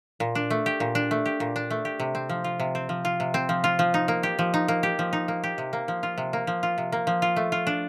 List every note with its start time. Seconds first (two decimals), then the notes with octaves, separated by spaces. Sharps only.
0.20 A#2
0.35 D4
0.50 A3
0.66 G4
0.80 A#2
0.95 D4
1.11 A3
1.26 G4
1.40 A#2
1.56 D4
1.71 A3
1.85 G4
2.00 C3
2.15 C4
2.29 F3
2.44 F4
2.60 C3
2.75 C4
2.89 F3
3.05 F4
3.20 C3
3.34 C4
3.49 F3
3.64 F4
3.79 F3
3.94 D#4
4.08 A#3
4.23 G4
4.39 F3
4.54 D#4
4.68 A#3
4.83 G4
4.99 F3
5.13 D#4
5.28 A#3
5.44 G4
5.58 C3
5.73 A#3
5.88 F3
6.03 F4
6.18 C3
6.33 A#3
6.47 F3
6.63 F4
6.78 C3
6.92 A#3
7.07 F3
7.22 F4
7.36 A3
7.52 F4
7.67 D4